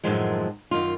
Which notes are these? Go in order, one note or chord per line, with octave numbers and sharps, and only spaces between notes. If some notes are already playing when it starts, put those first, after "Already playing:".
F#2 A2 D#3 F3 F#3 G#3
F#2 D#3 F4